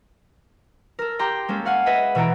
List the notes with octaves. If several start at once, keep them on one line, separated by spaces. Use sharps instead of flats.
A4 A#4
G4 G5 A#5 C6
G#3 A#3 C#4 A4
F#4 F5 F#5 G#5
G#4 B4 D#5 E5 B5
B2 E3 A4 C#5 A#5 D7